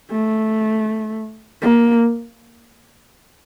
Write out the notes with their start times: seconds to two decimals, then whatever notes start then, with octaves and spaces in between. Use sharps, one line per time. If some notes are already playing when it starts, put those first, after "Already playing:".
0.11 A3
1.61 A#3